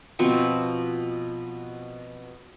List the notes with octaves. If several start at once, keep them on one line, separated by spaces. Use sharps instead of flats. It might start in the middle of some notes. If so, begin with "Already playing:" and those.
B2 F3 C4 C#6